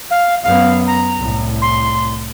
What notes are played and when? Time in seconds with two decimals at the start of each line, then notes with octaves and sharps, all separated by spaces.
0.11 F5
0.43 F#2 B3 F5
0.87 A#5
1.17 C2 A2
1.62 C6